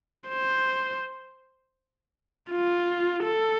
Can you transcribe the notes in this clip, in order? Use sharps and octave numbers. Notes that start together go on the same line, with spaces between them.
C5
F4
A4